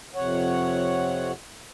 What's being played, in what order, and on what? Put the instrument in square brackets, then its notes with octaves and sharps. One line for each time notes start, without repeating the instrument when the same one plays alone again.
[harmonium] F2 C3 C#5 F#5